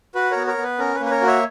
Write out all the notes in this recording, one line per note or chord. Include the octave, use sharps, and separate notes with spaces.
F#4 B4
A#4 C#5
B3
A#4 C#5
B3
B4
C#4 A#4
B4
A#3
B4
A#4 C#5
F#4
C#5 E5